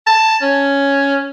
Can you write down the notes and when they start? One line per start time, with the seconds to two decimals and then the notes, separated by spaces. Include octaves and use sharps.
0.07 A5
0.42 C#4